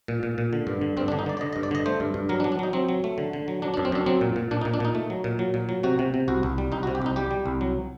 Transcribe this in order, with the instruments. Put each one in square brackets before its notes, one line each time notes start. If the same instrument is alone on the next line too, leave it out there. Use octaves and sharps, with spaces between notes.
[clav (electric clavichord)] A#2
A#2
A#2
D3
G2
D3
G2 C4
D4
D3
D#4
D3 D5
D5
D3 D#5
D#5
G2
D5
D3 D#5
A3 C5
G2
G2
F#3 A#4
D4
F#3
D4
F#3 D#4
F#3 C4
F#3
A3
D3
D3
F#3
F#3 D4
D4
F#2
C4
F#2 D4
F#3 C4
A#2
A#2
A#2 D4
D#4
A#2
D4
A#2 D#4
A3
F#3
A#2
F#3
A#2
F#3
C3 F#4
C3
C3
C2 F#4
C2
G3
C2 D#4
F#4
C3
G4
C2 D#4
G3 G4
G3
C2
F#3